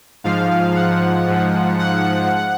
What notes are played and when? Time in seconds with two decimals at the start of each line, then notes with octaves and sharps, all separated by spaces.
0.24 G#2 F3 F5
0.76 F#5
1.27 G#2 F3
1.79 F#5